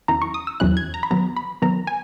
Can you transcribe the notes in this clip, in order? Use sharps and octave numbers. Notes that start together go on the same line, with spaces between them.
E2 D#3 F#3 C#4 E4 A#5
C#6
D#6
E6
E2 D#3 F#3 C#4 E4 F#6
G#6
A#5
B5
D#3 F#3 B3 A#5
B5
D#3 F#3 B3 A#5
G#5